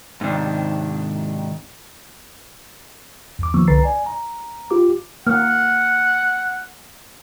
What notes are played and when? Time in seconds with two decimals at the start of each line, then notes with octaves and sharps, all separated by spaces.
0.21 G#2 C3 D#3 D4
3.39 E2 D6
3.54 D#3 F3 A#3 B3 C#6 E6
3.68 C2 D3 B4 A#5 A6 C7
3.84 D5 G#5
4.06 A#5
4.71 F4 G4 D6
5.27 A#3 F#5 F6